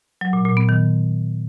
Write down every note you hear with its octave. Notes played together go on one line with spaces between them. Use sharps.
F#3
A#2
A#2
B3
D#3